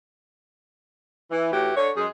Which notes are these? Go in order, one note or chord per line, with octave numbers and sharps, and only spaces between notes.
E3
A2 E3 E4 F#4 G4
D3 C#5
F#2 G#3 G#4